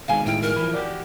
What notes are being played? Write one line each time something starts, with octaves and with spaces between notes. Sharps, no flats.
B2 D#3 G#3 F5 G#5
A2 E4 G5 F6
A#4
E3 F3 B5
F#4 G4 D5